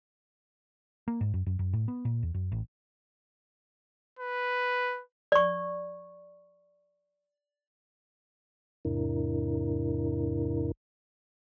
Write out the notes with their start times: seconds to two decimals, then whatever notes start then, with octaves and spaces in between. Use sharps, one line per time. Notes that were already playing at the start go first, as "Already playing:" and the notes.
1.08 A#3
1.21 G#2
1.34 F#2
1.46 F#2
1.59 F#2
1.73 A2
1.88 B3
2.05 A#2
2.23 E2
2.34 F#2
2.52 A1
4.19 B4
5.32 D5 C#6
8.85 E2 G#2 C3 D4 E4 A#4